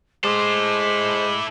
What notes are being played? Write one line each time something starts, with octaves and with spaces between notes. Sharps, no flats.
G#3 E4 A4 C5 D6